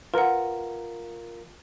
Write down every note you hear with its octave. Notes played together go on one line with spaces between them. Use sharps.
F4 A#4 B4 F#5